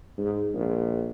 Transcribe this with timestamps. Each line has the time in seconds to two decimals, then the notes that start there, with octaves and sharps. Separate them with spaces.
0.18 G#2
0.54 A#1